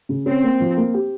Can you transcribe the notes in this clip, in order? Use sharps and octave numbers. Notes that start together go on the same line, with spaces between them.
C#3
C4 C#4
A#3
F3
A#3
G4